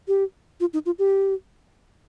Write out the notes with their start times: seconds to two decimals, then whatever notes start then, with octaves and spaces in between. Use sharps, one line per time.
0.08 G4
0.60 F4
0.73 D#4
0.86 F4
0.99 G4